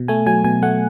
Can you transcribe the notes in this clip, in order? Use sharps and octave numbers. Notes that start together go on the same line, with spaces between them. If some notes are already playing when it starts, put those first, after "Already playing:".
Already playing: B2
A3 G#5
F#3 G#5
B2 G#5
A3 F#5